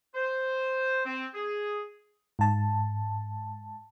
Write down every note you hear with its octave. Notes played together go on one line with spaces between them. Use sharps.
C5
C4
G#4
G#2 A5